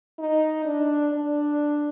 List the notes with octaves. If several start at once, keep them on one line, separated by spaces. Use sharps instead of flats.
D#4
D4
D4